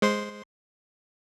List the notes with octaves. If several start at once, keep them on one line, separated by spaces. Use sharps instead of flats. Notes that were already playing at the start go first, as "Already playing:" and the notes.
G#3 C5 C6